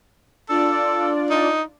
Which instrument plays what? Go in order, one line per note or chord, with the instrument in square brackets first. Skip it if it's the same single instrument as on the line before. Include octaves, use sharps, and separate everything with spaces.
[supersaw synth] D4 F4 D5 [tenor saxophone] A4
[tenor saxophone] D#4